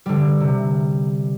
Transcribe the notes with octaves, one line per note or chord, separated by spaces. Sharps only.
D3 G3
C3